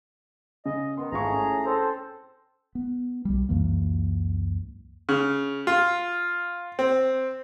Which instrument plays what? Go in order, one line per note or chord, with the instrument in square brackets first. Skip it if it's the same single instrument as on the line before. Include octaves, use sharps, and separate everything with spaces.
[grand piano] C#3 [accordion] D#5
[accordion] D#3 B3 [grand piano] C6
[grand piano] G#1 F4 C#6 [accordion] A2 G#4 A#5
[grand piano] C#4
[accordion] C4 A4 C5
[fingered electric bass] B3
B1 G3
C#2 F#2 E3 A#3
[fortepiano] C#3
F4
C4